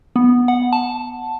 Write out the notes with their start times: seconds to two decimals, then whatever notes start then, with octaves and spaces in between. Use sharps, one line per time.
0.16 B3
0.48 F#5
0.73 A5